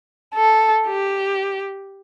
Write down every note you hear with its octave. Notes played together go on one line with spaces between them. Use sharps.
A4
G4